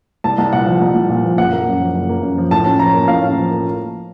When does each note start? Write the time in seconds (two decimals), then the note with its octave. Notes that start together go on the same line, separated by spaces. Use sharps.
0.24 C2 A5
0.38 C2
0.53 A#2 F#5
0.67 F3
0.82 C2
0.95 C2
1.09 A#2
1.24 F3
1.38 F#1 F#5
1.53 A#3
1.67 F#2
1.80 F3
1.94 F#1
2.09 A#3
2.23 F#2
2.38 F3
2.51 A2 A5
2.65 C#4
2.79 F3 A#5
2.94 A#3
3.08 A2 F5
3.22 C#4
3.36 F3
3.51 A#3